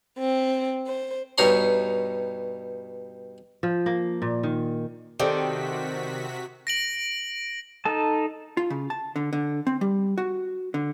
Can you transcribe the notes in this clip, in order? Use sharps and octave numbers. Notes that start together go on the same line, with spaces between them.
C4
C5
G2 B2 D#4 C#5 A#5 C6
F3
A#3
A#2
D#3
C3 D#3 C4 F#4 G4 A4 D5 B6
A#6 D7 F#7
D#4 A4 A5
F4
C#3
A5
D3
D3
C4
G3
F#4
D3